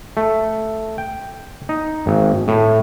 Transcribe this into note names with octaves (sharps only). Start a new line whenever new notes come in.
A3
G5
D#4
G#1
A2